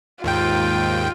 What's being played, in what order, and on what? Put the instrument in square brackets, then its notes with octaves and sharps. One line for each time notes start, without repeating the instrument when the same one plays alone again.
[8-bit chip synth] D#2 G#2 G5 [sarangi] F4